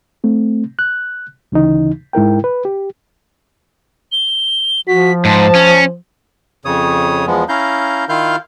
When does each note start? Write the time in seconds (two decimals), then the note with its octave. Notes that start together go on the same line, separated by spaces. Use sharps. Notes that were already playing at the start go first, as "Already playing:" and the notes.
0.24 A3 C4
0.79 F#6
1.52 D2 C#3 E3 D#4
2.13 G#2 E4 A#4 G5
2.44 B4
2.65 G4
4.12 G7
4.88 F3 F#4 B6
5.25 G#2 C5 A5
5.55 C#4
6.65 F2 C#3 C#5 D#6
7.27 E2 F3 G#3 B3
7.49 C#4 E4 F5 A#5 G6
8.09 D#3 E4 F4 F5 F6 G6